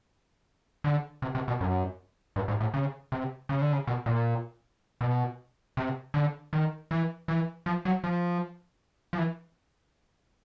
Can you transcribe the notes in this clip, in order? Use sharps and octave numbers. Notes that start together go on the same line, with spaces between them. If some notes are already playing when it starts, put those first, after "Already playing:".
D3
C3
C3
B2
F#2
G2
G#2
A2
C#3
C3
C#3
D3
C#3
B2
A#2
B2
C3
D3
D#3
E3
E3
F3
F#3
F3
F3
E3